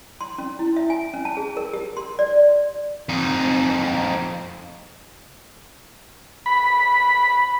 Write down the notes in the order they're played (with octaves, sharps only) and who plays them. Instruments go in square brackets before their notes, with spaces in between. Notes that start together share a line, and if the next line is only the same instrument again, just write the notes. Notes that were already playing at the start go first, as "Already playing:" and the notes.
[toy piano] C6
C#4
E4
E5
G#5
C#4
A5
G#4
A#4
G4
C6
D5
[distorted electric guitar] F2 D#4
[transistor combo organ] B5